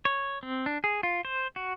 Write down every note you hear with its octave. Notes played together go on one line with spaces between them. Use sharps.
C#5
C4
D4
G#4
F4
C5
F#4